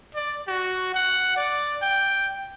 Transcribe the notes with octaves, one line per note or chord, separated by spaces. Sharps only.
D5
F#4
F#5
D5
G5